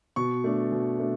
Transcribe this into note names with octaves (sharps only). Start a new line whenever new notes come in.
B2 C#6
A3 D4
B2
A3 D4